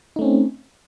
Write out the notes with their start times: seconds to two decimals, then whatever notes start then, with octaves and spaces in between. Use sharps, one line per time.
0.16 D#4
0.19 A3
0.21 C#4
0.24 C4